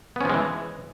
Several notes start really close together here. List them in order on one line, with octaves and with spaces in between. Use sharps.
B3 C#4 F3 G#3 E3